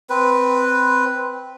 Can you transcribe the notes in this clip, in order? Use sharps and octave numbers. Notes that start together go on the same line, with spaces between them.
C4 B4